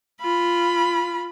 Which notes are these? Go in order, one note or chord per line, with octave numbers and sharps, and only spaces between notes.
F4 B5